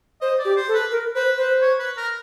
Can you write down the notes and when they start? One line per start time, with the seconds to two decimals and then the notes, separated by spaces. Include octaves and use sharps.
0.21 C5 D#5
0.39 D5
0.45 G4
0.56 C5
0.68 A4
0.74 B4
0.91 A#4
1.15 B4 C5
1.38 B4 C5
1.62 C#5
1.79 B4
1.97 A#4